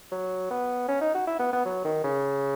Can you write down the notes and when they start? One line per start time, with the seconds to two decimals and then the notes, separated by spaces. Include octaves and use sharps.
0.12 F#3
0.50 B3
0.88 C#4
1.01 D#4
1.14 F#4
1.27 E4
1.39 B3
1.53 B3
1.65 F#3
1.84 D#3
2.04 C#3